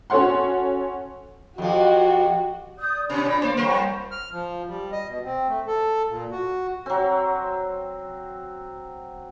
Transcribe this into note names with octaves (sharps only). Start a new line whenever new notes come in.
C#4 F#4 A4 C#5 F#5 C6
F2 F3 F#4 G4
D5 D#6 G6
B2 C#4 D4 C#5 D5 B5
A#2
A#3 C5 D5
F2 G3 A#4 C5 C#5 F#5 C#6
F6
F3
G3
D#5
B2
C4
A3
A4
A#2
F#4
F#3 C4